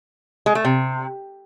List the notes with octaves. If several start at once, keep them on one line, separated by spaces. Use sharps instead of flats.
G#3
A3
C3